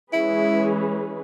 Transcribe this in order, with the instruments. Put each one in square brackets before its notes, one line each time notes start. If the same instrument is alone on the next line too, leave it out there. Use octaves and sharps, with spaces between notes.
[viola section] E3 G#3 C#4 G#4 B4 [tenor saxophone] E4